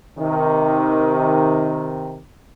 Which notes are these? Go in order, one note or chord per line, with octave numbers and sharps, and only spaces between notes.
C3 D#3